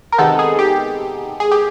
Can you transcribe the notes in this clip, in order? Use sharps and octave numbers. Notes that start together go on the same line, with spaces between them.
A#4
C3 D#3 G#3 B3 D#4 A4
G#4
G4
G#4
G4